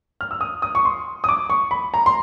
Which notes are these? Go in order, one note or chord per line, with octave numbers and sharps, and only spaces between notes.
F6
E6
D#6
D#6
C#6
C6
D#6
D6
C#6
B5
A#5
C6